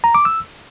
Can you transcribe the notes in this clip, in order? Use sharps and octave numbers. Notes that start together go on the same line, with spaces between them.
A#5
D6
E6